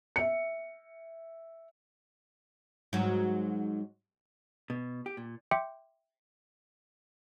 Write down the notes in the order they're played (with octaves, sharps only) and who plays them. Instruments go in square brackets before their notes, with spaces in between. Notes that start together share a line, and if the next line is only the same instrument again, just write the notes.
[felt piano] E5 C#7
[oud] G#2 F#3
[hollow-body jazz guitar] B2
G4
A#2
[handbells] E5 G5 C6 D6 G6 C#7